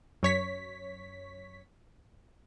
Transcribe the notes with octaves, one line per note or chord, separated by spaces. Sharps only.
F#2 C#5 B6